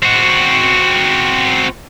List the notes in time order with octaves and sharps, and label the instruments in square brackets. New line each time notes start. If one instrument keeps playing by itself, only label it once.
[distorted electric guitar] C4 F#4